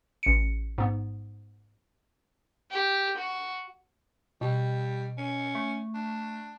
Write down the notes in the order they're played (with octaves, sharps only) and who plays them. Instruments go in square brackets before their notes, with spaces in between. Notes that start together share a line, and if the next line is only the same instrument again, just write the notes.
[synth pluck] A1 C#7
G#2 B3
[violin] G4
F#4
[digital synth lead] B2 [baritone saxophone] G3
[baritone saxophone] C#4
[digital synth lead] A3
[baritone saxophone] D4